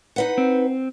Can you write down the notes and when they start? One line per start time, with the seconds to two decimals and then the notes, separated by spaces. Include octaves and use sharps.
0.16 D#4 B4 F#5
0.38 C4